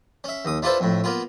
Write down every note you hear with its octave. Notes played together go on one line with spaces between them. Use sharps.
C#4 E5
D#2 D#6
D4 E4 F4 A4 B4 C5
F2 A2
A#3 B3 F4